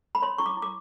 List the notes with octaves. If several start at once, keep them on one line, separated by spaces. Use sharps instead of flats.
B5
C#5 C6
E4 C#6
D6
E4
D6